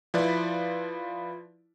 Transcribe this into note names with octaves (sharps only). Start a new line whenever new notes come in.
F3 E4 B4 D5